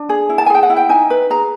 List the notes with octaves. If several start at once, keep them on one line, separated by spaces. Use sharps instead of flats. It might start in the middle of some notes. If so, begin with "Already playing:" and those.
Already playing: D4
G#4
E4
A5
G#5
G#4 G5
F#5
E4
G5
D#4 G#5
B4
G#4 A#5